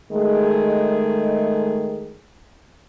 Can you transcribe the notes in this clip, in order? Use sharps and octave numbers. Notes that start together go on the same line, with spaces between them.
D#3 G#3 A3 G#4